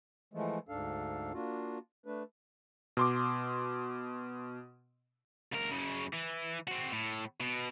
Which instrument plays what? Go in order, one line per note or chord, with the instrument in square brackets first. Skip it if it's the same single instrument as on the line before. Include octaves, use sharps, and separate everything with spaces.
[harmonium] E3 F3 G#3 A3
D2 G#2 D4 A4 F5
A#3 D4 F4 F#4
A3 D4 B4
[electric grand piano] B2 C6 D6
[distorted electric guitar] C#2 A#4
F#2 C#3
E3
C4 F#4
A2
B2